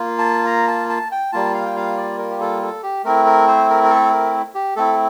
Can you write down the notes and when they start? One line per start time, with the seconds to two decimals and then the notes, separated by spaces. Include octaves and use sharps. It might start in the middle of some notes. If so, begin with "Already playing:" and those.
Already playing: A#3 F4
0.18 A5
0.46 A#5
0.68 A5
0.89 A5
1.12 G5
1.32 G3 A#3 F4 A5
1.54 F5
1.66 G5
1.76 F5
1.97 D5
2.18 A#4
2.31 G4
2.41 A4
2.62 A4
2.83 G4
3.04 A3 C4 E4 A#4
3.26 A#4
3.48 C5
3.69 A#4
3.83 A#4
3.90 A4
4.13 A#4
4.55 G4
4.76 A3 C4 E4 A4